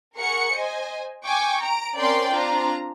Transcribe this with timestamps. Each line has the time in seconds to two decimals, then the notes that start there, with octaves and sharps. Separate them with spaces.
0.17 G#4 A#4 F#5 C#6 C#7
0.54 C5 D#5 G#5
1.25 G5 G#5 C#6 D6
1.61 A#5 D7
1.96 C4 C#4 A#4 D5 G5 C6
2.31 C4 D4 F4 A#5